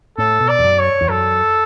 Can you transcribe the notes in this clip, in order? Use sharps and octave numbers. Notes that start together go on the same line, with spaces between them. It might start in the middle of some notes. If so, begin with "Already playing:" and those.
A2 A4
B2
D5
E2
F#2
C#5
E2
F#2 A4